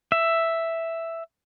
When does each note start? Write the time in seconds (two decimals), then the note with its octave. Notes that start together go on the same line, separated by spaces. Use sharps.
0.12 E5